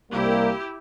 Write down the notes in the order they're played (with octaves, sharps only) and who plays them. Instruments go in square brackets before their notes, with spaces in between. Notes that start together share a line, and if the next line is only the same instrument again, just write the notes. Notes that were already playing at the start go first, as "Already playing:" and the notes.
[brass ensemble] C2 C3 G3 A#3 [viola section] E4 G4